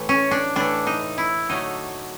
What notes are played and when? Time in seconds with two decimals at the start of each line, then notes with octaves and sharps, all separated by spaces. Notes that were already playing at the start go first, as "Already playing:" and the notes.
Already playing: A2 E3 A3
0.09 C#4
0.31 D4
0.56 A2 E3 A3 D4
0.87 D#4
1.18 E4
1.49 D3 F#3 A3 D#4